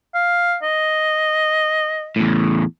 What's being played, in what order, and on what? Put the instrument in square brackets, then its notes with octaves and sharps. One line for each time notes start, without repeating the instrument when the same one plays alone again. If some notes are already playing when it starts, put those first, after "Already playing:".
[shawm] F5
D#5
[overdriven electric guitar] E2 A2